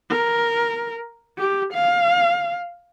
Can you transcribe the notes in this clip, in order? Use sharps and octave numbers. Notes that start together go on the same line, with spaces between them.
A#4
G4
F5